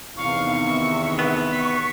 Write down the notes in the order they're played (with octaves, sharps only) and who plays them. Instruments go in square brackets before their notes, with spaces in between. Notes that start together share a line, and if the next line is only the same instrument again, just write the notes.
[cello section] E2 C3 D#3 [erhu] F5 [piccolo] C#6
[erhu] E5
[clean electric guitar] B3
[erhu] C#6 [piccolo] B6